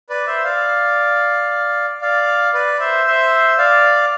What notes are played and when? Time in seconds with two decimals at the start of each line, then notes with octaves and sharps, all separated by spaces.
0.10 B4 D5
0.27 C5 E5
0.44 D5 F5
2.01 D5 F5
2.53 B4 D5
2.80 C5 E5
3.06 C5 E5
3.58 D5 F5